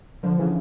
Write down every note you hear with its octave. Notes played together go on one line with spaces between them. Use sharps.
D3 F3
C#3 E3